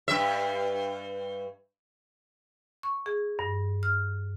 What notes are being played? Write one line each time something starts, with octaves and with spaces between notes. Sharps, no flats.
G2 E5
C#6
G#4
G2
F6